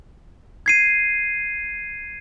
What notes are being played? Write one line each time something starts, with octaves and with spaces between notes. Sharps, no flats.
G#6 C7 D#7